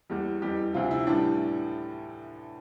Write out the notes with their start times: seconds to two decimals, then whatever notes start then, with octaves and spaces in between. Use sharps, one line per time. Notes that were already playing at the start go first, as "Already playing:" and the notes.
0.10 E2 E3 G3
0.42 F2 E3 G3 G4
0.74 D2 C3 F3 F4
0.91 E4
1.06 A2 E3 G3 D4